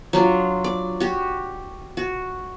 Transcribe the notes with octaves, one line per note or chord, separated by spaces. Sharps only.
F#3 D4 F4
D5
F#4 G4
F#4